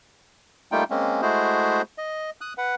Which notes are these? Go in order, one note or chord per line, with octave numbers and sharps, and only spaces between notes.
G3 A3 A#3 D#4 F4 G5
G#3 A#3 C4 C#4
G#3 A3 E4 F#4 G#4 C5
D#5
D#6 F#6
B4 F#5